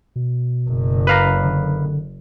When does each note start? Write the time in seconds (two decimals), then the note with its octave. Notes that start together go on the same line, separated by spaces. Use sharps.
0.16 B2
0.69 F#1 F#2
1.07 B4 F5 A#5
1.44 D3